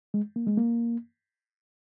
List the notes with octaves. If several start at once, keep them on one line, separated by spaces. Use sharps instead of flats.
G#3
A#3
G#3
A#3